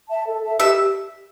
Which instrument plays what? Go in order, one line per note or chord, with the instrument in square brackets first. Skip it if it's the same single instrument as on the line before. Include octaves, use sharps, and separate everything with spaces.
[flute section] E5 A5
A4
E5 A5
[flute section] G4 [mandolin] E5